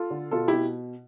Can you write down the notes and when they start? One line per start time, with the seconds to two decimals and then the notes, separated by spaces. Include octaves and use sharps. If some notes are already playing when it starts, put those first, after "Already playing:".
Already playing: F4 A4
0.11 D3
0.31 B2 F4 A4
0.48 E4 G4
0.53 B2